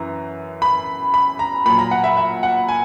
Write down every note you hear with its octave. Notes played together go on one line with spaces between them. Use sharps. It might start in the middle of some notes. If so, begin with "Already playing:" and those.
Already playing: F#2 E3 A#5
B5
B5
A#5
A#2 F#3 B5
A#5
F#5
E5
E5
F#5
G#5